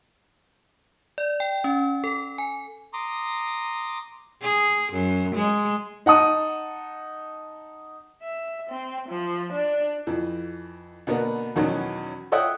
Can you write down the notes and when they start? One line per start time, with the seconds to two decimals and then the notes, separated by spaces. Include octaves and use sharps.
1.18 D5
1.40 G5
1.64 C#4
2.04 A4
2.38 G#5
2.93 A#5 C6 D6 D#6
4.41 G#4
4.93 F#2
5.35 G#3
6.06 D#4 F#5 A5 D#6
8.23 E5
8.70 C4
9.09 F3
9.53 D4
10.07 F2 E3
11.07 B2 D3 A#3 B3
11.56 E2 B2 D#3 F#3 C#4
12.32 A4 C#5 D#5 E5 F#5 G5